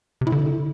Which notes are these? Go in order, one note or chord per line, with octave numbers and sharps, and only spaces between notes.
C3
E4
D3